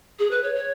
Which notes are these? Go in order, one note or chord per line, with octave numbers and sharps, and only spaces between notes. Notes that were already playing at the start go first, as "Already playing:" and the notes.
G#4
B4
C#5
C#5